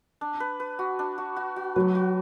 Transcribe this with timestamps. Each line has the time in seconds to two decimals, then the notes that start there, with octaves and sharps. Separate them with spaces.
0.21 D4
0.40 B4
0.60 B4
0.79 F#4
0.99 D4
1.18 F#4
1.36 F#4
1.56 F#4
1.76 F#3 B4
1.95 F#4